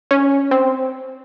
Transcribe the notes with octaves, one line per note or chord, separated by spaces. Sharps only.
C#4
C4